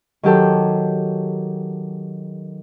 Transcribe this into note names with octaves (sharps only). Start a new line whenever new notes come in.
D#3 F#3 G4 A4